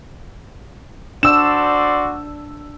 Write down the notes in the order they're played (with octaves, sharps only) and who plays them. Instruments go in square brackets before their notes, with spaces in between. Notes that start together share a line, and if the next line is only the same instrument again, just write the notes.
[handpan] D4 [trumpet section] F#4 C5 D5 [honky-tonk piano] E6 E7